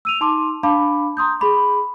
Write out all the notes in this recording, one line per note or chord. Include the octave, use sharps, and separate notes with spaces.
E6 D#7 F7
D#4 A5 C6 D6
D4 F5 A5 B5 D6
A#5 C6 D#6 G6
G#4 B5 D6